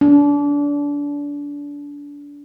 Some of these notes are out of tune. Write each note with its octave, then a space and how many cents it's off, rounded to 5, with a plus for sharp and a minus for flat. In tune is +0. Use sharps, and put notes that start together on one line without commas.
D4 -25